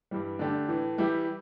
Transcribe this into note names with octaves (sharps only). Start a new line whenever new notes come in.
G2 E3 G3
D3 A3 D4 G4
A2 E3 A3
E3 G3 E4 G4